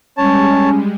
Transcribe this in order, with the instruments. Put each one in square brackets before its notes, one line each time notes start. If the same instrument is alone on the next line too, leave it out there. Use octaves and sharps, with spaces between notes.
[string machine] G3 G#3 [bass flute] C#4 [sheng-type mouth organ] C#5 A5